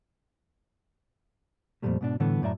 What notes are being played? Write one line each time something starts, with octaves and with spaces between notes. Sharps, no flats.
F2 A#2 C#3 F3 G3 A3
G#2 B2 D4
A2 D3 E3 G3 A3 B3
F#2 A2 D5 E5 A#5